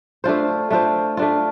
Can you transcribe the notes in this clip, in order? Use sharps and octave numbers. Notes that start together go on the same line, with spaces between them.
A3 D4 F4 C5
A3 D4 F4 C5
A3 D4 F4